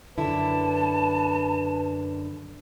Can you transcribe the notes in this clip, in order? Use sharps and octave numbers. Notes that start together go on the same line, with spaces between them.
F#2 D3 E4 B4 A5